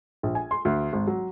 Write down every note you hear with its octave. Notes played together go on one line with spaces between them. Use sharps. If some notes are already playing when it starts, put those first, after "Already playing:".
A#1
G#5
C6
D2
G#1
F#3